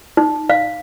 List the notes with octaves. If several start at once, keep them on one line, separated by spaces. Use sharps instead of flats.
D#4
F5